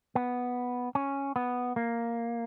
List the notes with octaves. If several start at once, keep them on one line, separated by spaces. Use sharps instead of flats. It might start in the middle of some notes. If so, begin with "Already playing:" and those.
B3
C#4
B3
A#3